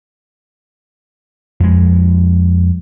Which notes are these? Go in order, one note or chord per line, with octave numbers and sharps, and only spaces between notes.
F2 G#3